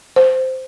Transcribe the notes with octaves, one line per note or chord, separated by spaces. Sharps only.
C5